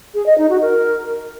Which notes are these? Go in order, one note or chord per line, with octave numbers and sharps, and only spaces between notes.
G#4
D#5
D#4
F#4
A#4